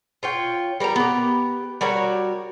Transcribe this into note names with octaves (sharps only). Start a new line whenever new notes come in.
F4 C#5 G5
G3 A#4 B4 A#5
B3 G4
G3 F#4 A#4 C#5